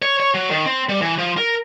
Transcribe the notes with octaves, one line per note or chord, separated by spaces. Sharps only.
C#5
C#5
F#3
D#3
C4
G3
E3
F3
A#4